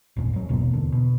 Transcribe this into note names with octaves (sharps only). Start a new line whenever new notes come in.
G#1 E2 A#2
G#2 F#3
G#1 E2 B2 A#3
E2 D3
B2